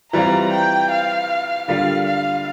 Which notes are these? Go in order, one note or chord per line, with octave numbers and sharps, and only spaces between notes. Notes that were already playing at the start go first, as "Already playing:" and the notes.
E3 G3 C4 F4 A#5
G5
F5
D3 G3 A#3 F4 F5
F5